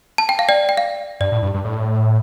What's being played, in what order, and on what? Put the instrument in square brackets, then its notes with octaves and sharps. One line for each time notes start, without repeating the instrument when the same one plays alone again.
[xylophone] A5
G5
F5
D5 G5
G5
F5
[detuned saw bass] G2 [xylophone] D5
[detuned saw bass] A2
G2
G2
A2